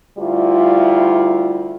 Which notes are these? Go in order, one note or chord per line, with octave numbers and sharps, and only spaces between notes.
D2 G3 E4 F4